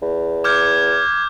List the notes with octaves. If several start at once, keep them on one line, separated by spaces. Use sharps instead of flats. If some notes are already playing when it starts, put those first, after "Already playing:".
E2
D6 F6 G6 G#6